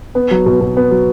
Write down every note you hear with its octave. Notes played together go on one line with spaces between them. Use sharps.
B3
F#3
B2
B2
B3
F#3